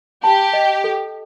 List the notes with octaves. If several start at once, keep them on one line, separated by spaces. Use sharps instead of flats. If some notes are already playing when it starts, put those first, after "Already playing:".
G4 A5
D#5
A4